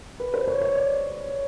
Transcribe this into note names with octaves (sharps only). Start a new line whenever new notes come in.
B4
C5
C#5
C#5
D5